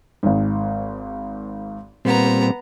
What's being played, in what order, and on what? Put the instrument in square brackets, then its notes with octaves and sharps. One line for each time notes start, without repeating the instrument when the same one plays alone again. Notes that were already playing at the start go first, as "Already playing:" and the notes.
[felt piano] G#1 G#2
[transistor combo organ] A#2 G3 C4 [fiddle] B3 A#5